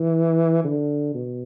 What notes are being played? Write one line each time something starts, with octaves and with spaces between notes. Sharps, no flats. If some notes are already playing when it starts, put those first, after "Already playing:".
Already playing: E3
D3
B2